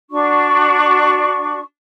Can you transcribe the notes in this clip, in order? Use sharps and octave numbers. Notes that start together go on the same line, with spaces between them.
D4 F#4 C#6